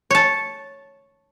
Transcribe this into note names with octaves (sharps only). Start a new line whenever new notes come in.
C#5 A5